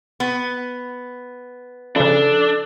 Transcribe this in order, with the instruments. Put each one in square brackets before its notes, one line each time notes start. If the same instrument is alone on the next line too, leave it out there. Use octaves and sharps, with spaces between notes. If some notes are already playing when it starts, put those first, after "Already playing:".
[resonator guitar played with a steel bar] B3
[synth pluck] C#3 F3 [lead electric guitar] D4 [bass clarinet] A4